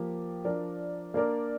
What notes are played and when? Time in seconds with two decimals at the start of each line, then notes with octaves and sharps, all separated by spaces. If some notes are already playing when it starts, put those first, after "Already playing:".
Already playing: F3 A#3 G4
0.45 F3 D4 A#4 D5
1.14 A#3 D4 A#4 D5